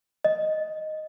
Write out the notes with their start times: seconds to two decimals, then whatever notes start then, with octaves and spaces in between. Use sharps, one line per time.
0.25 D#5